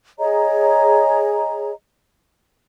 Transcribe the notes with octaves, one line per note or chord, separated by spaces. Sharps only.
G#4 C#5 D#5 A#5